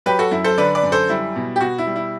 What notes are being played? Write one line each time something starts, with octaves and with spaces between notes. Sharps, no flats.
F#3 G4 B4
F#4 A4
F#2 E4
A4 C5
D3 B4 D5
B4 D5
F#2
A4 C5
G3 E4
B2
G4
B2 F#4
E4
G3
E4